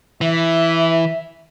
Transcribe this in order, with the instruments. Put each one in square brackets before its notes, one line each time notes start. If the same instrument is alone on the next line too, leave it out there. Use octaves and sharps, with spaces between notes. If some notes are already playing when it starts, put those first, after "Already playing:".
[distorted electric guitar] E3 [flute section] E5